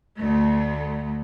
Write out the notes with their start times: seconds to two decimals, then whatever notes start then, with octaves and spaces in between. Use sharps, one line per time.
0.18 D2 A3